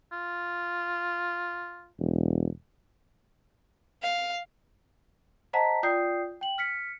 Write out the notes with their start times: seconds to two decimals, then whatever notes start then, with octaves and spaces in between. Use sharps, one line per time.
0.12 F4
2.00 E1
4.03 F5
5.53 C5 D#5 F#5 A5 A#5 B6
5.83 F4 D5 G5 D#6 G6 C7
6.41 G5 F#7
6.58 F6 B6 C#7